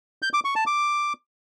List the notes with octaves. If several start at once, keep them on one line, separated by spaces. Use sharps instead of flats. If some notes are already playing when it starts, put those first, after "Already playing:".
G6
D6
C#6
A5
D6